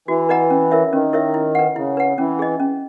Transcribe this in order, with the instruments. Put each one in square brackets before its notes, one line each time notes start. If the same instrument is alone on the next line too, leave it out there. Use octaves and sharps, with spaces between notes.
[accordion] E3 [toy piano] F#4
[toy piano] B4 D#5 F#5 A#5
C#4
E4 A#4 C#5 E5
[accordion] D#3 [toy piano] C#4
[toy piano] E4 A#4 C#5 E5
E4
B4 F#5
[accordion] C#3 [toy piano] E4
[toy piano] B4 F#5
[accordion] E3 [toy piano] C#4
[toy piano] G#4 D#5
C#4